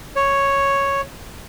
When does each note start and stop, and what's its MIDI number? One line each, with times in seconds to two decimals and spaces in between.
0.16 1.01 73